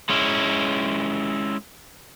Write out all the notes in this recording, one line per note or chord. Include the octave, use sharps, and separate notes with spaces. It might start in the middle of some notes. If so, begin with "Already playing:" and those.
G#3 C#4 E4